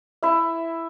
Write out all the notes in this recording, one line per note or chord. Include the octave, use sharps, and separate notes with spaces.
E4 E5